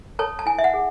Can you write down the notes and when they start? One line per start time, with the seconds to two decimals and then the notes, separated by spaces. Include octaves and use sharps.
0.19 A4 C#5 A5
0.39 A5
0.46 E4 G#5
0.58 E5
0.64 F#5
0.74 G#4